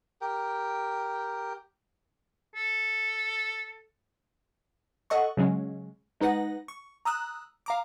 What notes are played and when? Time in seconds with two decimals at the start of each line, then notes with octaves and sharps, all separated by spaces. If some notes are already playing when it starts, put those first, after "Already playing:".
0.21 G4 A#4 G5
2.55 A4
5.10 A4 D#5 F#5 C#6
5.37 C#3 F#3 G#3 C#4
6.20 G#3 D#4 B4 F#5 A#6
6.68 C#6
7.05 A#5 D#6 E6 F#6
7.66 F5 A#5 D6